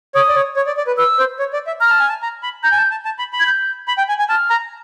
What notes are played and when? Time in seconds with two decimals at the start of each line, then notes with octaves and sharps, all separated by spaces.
0.15 C#5 D#6
0.29 D5
0.36 C#5
0.56 C#5
0.67 D5
0.77 D5
0.87 B4
0.98 B4 E6
1.18 C5
1.39 C#5
1.53 D5
1.67 E5
1.81 A#5 F6
1.90 A5
1.99 G#5
2.09 A5
2.22 A#5
2.43 B5
2.64 A#5 G6
2.72 G#5
2.77 A5
2.91 A5
3.05 A5
3.19 B5
3.33 B5
3.40 G#6
3.47 G6
3.88 B5
3.98 G5
4.08 G#5
4.19 G#5
4.29 A5 F6
4.50 A#5